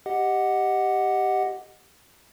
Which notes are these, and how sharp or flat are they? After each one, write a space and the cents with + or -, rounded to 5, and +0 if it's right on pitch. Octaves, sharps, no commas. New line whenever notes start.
G4 +0 D#5 +0 F#5 +0